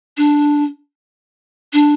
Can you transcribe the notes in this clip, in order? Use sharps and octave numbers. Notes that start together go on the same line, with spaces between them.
D4
D4